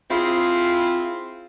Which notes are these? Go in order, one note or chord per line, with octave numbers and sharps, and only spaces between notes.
C4 E4 F4 G#4